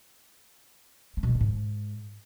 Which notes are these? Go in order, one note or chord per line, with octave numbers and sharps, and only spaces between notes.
A3
B2
E3
D3
G#2